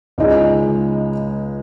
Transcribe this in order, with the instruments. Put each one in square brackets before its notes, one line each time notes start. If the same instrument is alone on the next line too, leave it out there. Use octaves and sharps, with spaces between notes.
[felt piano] C#2 C#3 G#3 D#4 G#4